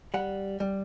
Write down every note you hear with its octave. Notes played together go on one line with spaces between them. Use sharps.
G3 F#5
G3